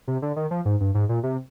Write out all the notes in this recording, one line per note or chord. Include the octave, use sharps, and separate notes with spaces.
C3
D3
D#3
F3
G#2
G2
G#2
A#2
C3